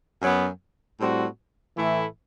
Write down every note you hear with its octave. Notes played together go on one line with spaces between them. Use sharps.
F#2 F#3 B3
A2 G3 C4 F#4
A2 E3 A3 E4